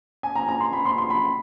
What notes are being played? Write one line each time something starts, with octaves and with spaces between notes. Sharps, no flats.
G#5
A#5
A#5
C6
B5
C6
C6
B5